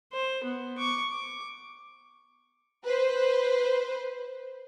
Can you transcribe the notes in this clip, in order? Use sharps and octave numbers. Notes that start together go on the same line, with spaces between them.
C5
B3
C#6 D6
D6
B4 C5